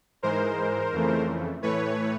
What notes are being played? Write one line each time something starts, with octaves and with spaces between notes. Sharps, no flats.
G#2 E3 G#3 A#4 C5
F2 C#3 E3 A3
A2 E3 A3 B4 C#5